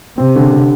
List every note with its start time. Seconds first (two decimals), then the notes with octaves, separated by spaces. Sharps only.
0.17 C3 C4
0.36 D3
0.52 D3